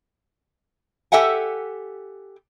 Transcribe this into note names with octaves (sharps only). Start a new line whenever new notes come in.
G4 A4 E5 F#5 G#5